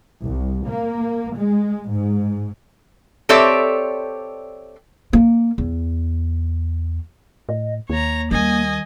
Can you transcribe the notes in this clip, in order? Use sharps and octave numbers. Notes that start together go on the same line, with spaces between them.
C2
A#3
G#3
G#2
C4 G4 A4 C#5 D5 E5
A#3
E2
A2 D#5
D#2 A#3 C#5 A#5
D#3 G3 D#5 G#5